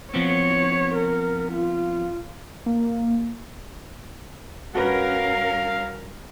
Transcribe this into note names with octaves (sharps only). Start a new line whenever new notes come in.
F3 B3 C4 C#5
A#4
F4
A#3
G2 C#4 F#4 A#4 B4 F5